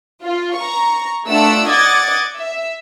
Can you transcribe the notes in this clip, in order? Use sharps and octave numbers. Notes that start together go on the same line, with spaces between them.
F4
A#5 C#6
A3 D4 F4 F#5 E6 D7
D5 D#5 F#5 D6 G#6 A6
E5